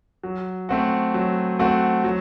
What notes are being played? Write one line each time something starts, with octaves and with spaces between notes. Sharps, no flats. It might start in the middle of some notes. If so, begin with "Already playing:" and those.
F#3
A3 C4 F#4
F#3
A3 C4 F#4
F#3